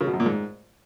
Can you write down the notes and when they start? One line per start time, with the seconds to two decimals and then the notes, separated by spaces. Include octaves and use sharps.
0.01 C#3
0.07 B2
0.13 F#2
0.20 A#2
0.26 G#2